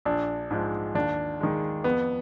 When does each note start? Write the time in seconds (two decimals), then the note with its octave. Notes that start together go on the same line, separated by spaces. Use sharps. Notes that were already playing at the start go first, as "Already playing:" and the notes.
0.05 A#1 D4
0.51 G#2 F3 G#3
0.95 D#2 D4
1.41 D#3 G#3
1.84 F2 B3